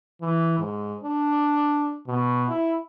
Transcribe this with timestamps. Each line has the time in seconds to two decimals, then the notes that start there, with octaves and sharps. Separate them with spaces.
0.21 E3
0.59 G#2
1.03 D4
2.07 B2
2.49 E4